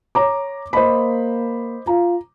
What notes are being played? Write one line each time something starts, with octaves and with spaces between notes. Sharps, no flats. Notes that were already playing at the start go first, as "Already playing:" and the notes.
C#5 A#5 D6
A#3 C5 D#5 B5
F4 A#5